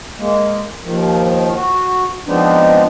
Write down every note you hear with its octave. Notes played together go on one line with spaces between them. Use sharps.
G#3 A#3
D#2 D#3 F3
F#4
F3 G#3 B3 C4 D4 D#4